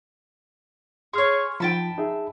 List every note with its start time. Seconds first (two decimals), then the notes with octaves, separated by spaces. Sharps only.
1.13 G#4 C#5 C6 F6
1.60 F3 D#4 G5 A5 B5
1.98 D#4 G#4 E5